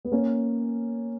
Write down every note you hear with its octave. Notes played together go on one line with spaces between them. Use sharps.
B3
A#3 C#4